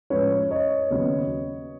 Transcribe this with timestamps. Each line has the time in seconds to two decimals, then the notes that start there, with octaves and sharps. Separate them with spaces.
0.10 A2 F3 G#3 C#4 B4 C#5
0.50 C#5 D#5
0.91 D#2 C#3 F#3 B3